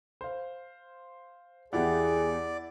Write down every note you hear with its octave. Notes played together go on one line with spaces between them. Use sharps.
C5 F5
E2 E4 G4 G#4 D5 F#5